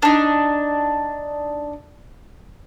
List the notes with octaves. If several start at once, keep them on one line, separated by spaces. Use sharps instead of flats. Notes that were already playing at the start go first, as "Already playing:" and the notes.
D4 D#4